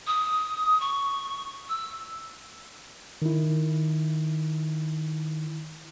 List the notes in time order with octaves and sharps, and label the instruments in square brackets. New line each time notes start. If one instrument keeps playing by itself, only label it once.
[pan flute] D#6
C#6
E6
[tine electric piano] D#3 E4